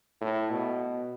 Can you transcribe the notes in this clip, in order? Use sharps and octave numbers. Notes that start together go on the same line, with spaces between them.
A2
B2